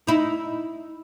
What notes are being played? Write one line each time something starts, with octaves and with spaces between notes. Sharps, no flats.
D#4 E4